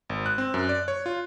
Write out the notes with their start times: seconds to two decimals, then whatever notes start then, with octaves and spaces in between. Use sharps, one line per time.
0.09 G#1
0.26 F#6
0.38 C4
0.54 F#2
0.69 D5
0.88 C#5
1.06 F4